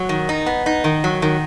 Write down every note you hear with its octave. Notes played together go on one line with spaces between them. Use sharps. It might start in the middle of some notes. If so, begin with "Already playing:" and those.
Already playing: F#3
D#3
D#4
B3
D#4
D#3
F#3
D#3